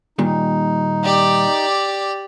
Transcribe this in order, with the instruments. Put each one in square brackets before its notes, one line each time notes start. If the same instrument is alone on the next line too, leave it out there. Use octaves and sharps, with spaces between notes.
[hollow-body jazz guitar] A#2 D#3 G3 [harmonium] D#4
[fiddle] G4 D5